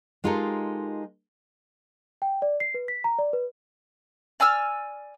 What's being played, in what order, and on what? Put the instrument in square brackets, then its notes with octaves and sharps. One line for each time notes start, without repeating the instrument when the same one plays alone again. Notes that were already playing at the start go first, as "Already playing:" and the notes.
[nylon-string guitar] G#3 D#4 F4 G4 A4 A#4
[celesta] G5
D5
C7
B4
B6
A#5
D5
B4
[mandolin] D5 G#5 E6 F6